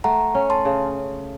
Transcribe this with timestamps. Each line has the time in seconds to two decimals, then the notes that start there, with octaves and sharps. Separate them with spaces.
0.04 A3 F#5 A#5
0.35 C#4
0.50 A5 C6
0.65 C#3